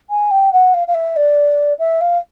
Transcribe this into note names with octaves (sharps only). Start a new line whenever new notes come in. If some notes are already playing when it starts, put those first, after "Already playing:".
G#5
G5
F#5
F5
F5
E5
D5
E5
F5